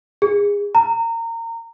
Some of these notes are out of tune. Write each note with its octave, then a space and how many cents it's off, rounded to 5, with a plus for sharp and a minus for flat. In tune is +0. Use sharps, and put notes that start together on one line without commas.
G#4 -25
A#5 -25